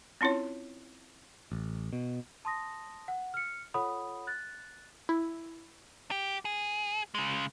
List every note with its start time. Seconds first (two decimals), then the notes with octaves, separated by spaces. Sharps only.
0.21 C4 C#4 E4 F4 C#5
1.52 A1
1.93 B2
2.45 A5 C6 D#6 A#6
3.08 F#5
3.34 F6 C#7
3.74 F4 A4 C#5 F#5 B5 D#6
4.27 F#6 A6
5.09 E4
6.11 G4
6.45 G#4
7.15 C#3 G#3